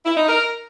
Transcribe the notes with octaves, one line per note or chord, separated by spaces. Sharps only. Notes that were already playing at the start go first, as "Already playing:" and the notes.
E4
D#4
A#4